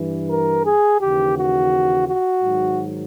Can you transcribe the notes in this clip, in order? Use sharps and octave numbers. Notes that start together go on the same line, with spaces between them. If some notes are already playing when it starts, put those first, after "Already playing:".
Already playing: G2 E3
A#4
G#4
D#2 C#3 E3 G4
F#4
F#4
G#2 D#3 F#3